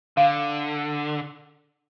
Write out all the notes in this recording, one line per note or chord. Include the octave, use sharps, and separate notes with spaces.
D3 F5